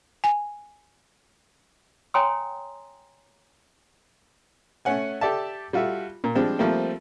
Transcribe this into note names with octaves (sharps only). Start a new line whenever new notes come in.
G#5
C#5 G5 G#5 A#5 C6 D#6
A3 C#4 F#5 G#5
G4 A4 D5 E5 A5
G3 F4 F#4 A4 E5
A#2
F3 G3 G#3 C4 D4
F3 G3 A3 A#3 C4 F4